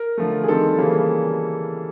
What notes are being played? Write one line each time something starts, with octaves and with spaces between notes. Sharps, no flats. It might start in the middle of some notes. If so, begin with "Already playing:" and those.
Already playing: A#4
D3 F3 A3
G#4
D#3 G3 C4 A4
C#3 E3 G3 A#3 C#4